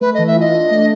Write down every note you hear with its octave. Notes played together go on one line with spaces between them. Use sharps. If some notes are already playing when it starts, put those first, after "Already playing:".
A3 B4
D#5
E3
E5
F4
D#5
D4
A3